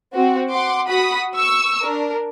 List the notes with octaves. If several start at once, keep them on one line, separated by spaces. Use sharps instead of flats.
C4 F#4
F#5 C6 D6
F#4 F#5 B5 D#6 B6
C#6 E6
D4 A#4